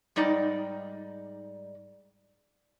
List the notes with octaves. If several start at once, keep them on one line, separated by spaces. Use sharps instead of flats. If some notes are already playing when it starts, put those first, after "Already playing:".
G#2 G3 D#4 D5 D#5